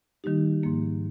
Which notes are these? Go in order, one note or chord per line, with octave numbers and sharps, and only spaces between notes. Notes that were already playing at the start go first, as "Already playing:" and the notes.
D#3 G3 A#3 D#4 G4
G#2 F3 A#3